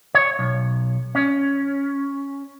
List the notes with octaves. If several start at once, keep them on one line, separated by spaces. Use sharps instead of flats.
C#5
B1
C#4